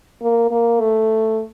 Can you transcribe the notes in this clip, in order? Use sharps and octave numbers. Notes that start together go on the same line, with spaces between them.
A#3
A#3
A3